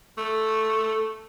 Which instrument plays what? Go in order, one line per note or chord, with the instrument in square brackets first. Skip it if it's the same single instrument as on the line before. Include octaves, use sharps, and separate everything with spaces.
[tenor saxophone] A3